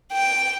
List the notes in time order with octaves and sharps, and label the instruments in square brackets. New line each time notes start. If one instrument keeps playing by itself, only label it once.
[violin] G5